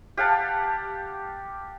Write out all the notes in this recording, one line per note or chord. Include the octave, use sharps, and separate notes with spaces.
G4 F5 F#5 A5